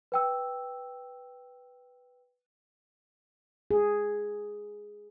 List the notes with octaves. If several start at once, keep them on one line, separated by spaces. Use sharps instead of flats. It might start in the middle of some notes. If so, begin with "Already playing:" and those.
B4 G5 E6
G#4